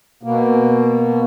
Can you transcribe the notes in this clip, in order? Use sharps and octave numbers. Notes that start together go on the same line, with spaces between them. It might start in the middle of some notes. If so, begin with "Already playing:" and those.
B2 A#3